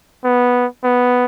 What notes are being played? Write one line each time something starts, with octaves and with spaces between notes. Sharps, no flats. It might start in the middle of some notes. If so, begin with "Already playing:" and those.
B3
B3